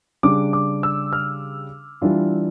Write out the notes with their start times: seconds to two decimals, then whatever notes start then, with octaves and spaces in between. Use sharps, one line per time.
0.23 C#3 G3 D4 D6
0.53 D6
0.83 E6
1.13 F6
2.02 E3 G3 D4 F4